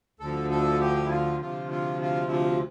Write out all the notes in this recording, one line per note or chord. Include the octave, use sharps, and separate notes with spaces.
D2 D3 F3 A4
A4
G4
E4
F4
D2 C3 F3 F4
F4
F4
E4
F4